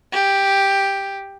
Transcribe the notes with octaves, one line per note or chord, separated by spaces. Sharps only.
G4